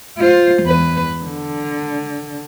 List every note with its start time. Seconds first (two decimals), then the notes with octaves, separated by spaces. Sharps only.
0.17 F4 C5
0.62 E2 B4
1.25 D3